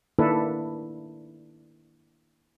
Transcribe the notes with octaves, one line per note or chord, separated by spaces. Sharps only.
D#3 A#3 D4 E4 A4 B4